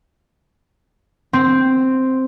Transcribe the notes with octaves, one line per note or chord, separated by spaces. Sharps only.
C4